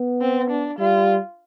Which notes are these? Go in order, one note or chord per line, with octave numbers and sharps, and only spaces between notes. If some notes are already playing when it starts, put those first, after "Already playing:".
Already playing: B3
C4
D4
G3 F4